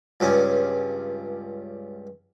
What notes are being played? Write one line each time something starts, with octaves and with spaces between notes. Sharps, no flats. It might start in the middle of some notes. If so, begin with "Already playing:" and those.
C#2 G2 C#4